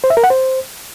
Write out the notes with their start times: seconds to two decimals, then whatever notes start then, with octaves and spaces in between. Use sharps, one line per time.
0.04 C5
0.10 E5
0.17 A#4
0.24 F#5
0.30 C5